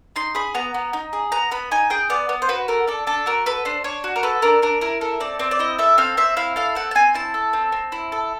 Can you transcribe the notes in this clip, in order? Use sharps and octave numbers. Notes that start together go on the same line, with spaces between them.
D#4 C6
G#4 B5
B3 A#5
B3
D#4
G#4
B3 A#5
B3 B5
D#4 G#5
G#4 G5
B3 D5
B3
C5
F#4 B4
A4 A#4
D4 A4
D4 A4
F#4 A#4
A4 B4
D4 C5
D4 C#5
F#4
A#4
A4 B4
D4 A#4
D4 A#4
E4 A#4
A4 A#4
C4 D5
C4 D5
D5
E4 D#5
A4 E5
C4 F5
C4 E5
E4 F5
A4 F5
C4 F#5
A5
C4 G#5
E4 A5
A4
C4
C4
E4
A4